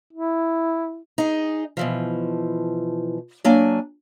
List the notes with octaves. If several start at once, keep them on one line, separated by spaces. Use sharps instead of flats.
E4
D#4 G#4
B2 E3 F3
F#3 A#3 D4 G#5